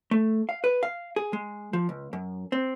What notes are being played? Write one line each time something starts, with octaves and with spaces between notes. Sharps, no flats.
A3
F5
B4
F5
G#4
G#3
F3
C#2
F#2
C4